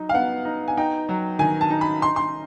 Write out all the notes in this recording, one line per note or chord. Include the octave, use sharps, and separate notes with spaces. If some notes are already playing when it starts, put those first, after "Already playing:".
Already playing: F#3 D#4
F5
B3 F#5
D#4
G#5
D#4 G5
F#3
D#3 G#5
A5
D#4
B5
D#4 C6
C6